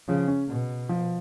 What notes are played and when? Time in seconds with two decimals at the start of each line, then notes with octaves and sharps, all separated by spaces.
0.08 C#3 F3
0.28 C#4
0.49 B2
0.89 F3